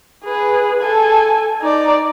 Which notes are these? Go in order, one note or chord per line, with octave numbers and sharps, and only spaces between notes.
G#4 B4
A4 G#5
D#4 D5